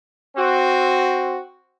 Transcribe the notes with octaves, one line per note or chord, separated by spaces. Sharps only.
C4 F#4